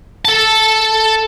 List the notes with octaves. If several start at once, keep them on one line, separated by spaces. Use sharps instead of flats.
A4 A5